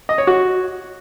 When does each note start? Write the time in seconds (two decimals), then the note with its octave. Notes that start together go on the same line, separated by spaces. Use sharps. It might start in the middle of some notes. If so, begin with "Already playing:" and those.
0.09 D#5
0.18 C#5
0.27 F#4